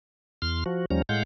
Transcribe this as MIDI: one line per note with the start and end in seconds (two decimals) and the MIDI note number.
0.42 0.64 40
0.42 0.64 84
0.42 0.64 89
0.66 0.85 53
0.66 0.85 66
0.90 1.02 39
0.90 1.02 53
0.90 1.02 55
0.90 1.02 61
0.90 1.02 82
1.09 1.23 45
1.09 1.23 56
1.09 1.23 77
1.09 1.23 78
1.09 1.23 91